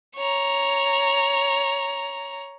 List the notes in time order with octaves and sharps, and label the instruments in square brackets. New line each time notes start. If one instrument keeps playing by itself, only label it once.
[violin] C#5 A#5